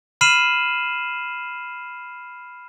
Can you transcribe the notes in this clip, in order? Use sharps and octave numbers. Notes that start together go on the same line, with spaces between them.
B5 F6 C7 D#7 E7 F#7